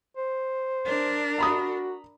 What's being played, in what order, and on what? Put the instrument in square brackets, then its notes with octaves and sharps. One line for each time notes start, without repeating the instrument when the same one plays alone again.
[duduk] C5
[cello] D4 A#4
[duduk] F#4 [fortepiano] A#5 B5 D#6